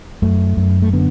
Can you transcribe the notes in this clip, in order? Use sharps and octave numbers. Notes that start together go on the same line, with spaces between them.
F#2 A3
F#2
A3
D3 B3